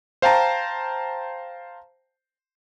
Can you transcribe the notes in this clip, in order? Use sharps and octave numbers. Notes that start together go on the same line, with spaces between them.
C5 F5 G5 A5 A#5